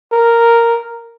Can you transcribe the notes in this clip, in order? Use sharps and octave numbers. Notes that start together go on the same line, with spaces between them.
A#4